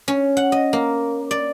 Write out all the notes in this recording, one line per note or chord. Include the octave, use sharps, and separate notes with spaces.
C#4
F#5
D#5
A#3
D5